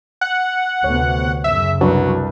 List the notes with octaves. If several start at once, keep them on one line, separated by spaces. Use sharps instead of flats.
F#5
D2 C3 B3 C#5
F#2 C#3 E5
C2 F#3 D4 B4